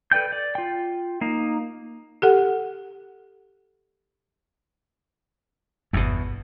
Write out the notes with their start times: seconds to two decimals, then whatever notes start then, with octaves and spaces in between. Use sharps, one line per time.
0.12 A4 B4 D5 G5 G6
0.32 D5
0.55 F4 G5
1.21 A#3 D#4
2.22 G4 A4 F#5
5.93 G1 E2 B2